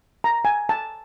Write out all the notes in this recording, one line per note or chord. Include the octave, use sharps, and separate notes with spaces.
A#5
G#5
A5